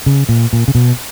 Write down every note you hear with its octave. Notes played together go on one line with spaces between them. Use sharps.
C#3
A#2
A#2
C#3
B2